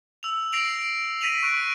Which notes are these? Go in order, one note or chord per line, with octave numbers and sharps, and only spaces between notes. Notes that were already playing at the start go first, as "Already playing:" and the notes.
E6 F7
A#6 C7 D7 F7 F#7
A#6 B6 D#7 F7 F#7
C#6 F#6 D7 D#7